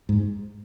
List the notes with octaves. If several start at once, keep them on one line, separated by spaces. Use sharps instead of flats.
G#2